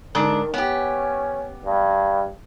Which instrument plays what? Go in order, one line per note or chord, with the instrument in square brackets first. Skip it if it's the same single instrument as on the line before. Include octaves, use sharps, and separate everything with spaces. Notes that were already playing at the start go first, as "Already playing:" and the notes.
[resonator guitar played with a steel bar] G#2 D3 D4 [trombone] D#3
[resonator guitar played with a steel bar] B3 G4 [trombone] C#4
[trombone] G2